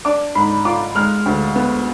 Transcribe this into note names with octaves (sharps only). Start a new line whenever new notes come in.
D4 D6
G#2 B5
F4 D6
G#3 F6
D2
B3